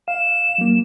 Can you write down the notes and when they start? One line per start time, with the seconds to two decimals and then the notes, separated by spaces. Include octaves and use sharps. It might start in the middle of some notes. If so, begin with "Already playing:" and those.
0.08 F5 E7
0.58 F#3 A#3